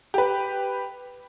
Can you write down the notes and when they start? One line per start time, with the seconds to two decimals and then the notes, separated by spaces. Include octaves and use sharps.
0.14 G4 B4